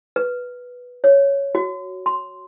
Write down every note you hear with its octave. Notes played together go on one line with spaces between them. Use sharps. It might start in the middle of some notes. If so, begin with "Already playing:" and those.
B4
C#5
F#4
C6